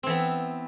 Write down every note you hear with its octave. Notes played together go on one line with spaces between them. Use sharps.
E3 B3 C4